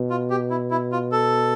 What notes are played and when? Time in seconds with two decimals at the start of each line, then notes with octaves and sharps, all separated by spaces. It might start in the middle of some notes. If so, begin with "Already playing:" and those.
Already playing: B2
0.10 F4
0.30 G4
0.50 E4
0.71 E4
0.92 F4
1.12 A4